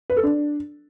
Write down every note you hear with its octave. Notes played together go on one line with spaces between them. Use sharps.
B4
A4
D4